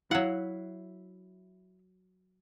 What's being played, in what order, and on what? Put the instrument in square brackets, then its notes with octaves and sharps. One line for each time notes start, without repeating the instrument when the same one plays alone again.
[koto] F#3 F#5 [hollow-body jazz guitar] E4 F5